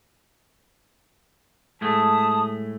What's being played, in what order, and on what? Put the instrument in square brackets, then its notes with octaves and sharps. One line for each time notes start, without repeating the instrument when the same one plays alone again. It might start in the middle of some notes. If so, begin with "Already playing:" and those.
[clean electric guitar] A2 G#3 A3 [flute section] A5 D#6